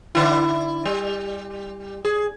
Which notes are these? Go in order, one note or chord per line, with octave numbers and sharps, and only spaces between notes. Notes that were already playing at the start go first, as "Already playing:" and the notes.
D3 E4
G3
G#4